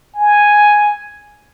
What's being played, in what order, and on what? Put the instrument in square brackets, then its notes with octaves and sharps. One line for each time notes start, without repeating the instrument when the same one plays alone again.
[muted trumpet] G#5